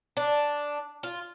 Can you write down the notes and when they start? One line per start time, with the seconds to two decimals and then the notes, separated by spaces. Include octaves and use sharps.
0.17 D4
1.03 F4